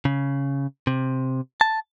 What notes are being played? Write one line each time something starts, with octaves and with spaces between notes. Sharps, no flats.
C#3
C3
A5